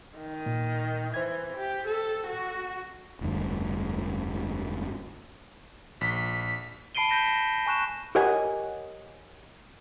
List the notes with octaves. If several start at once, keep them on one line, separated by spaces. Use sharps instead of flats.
D#3
A#2
E3 C5 G#6
G4
A4
F#4
F1 D2 G2
A#1 B6
A5 B5 C7 D7 D#7 G7
G6 A#6 B6 E7
G#5 C#6 F#6 E7
G4 A#4 C#5 D#5 F#5 G#5